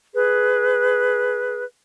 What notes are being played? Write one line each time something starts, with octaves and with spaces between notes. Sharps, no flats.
G#4 B4